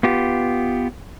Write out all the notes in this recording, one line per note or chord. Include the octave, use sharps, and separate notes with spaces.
B3 F4 G4